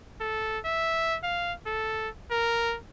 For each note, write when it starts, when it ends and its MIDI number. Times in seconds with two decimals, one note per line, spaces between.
0.21 0.59 69
0.65 1.17 76
1.23 1.53 77
1.66 2.09 69
2.31 2.76 70